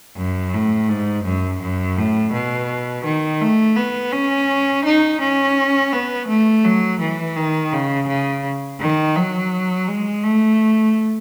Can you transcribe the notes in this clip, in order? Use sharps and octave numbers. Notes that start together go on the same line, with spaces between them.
F#2
A2
G#2
F#2
F#2
A2
B2
D#3
A3
B3
C#4
D#4
C#4
B3
A3
F#3
E3
D#3
C#3
C#3
D#3
F#3
G#3
A3